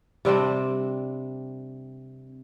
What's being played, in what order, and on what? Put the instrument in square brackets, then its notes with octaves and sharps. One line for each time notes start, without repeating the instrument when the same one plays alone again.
[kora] C3 G3 C4 D4